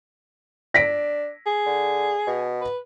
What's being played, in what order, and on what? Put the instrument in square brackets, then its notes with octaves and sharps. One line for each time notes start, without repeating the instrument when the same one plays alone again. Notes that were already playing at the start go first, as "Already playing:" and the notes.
[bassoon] D4 [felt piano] A#6 B6 D7
[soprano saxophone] G#4
[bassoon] D3
B2
[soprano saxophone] B4